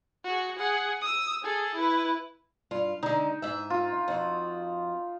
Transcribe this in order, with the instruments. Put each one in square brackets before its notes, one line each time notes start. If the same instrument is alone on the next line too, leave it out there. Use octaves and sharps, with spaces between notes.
[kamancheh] F#4 G#4
G#4 F#5
D#6 E6
G#4 A4
E4 B4
[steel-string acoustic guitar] G2 F4
[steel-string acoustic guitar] D3 G#3 [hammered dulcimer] D#4
[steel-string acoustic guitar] G#2 E5
[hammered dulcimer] F4
[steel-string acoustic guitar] F2 F#4